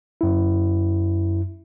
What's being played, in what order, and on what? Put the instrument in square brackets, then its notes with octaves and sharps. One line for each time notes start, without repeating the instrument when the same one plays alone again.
[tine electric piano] F#2 E4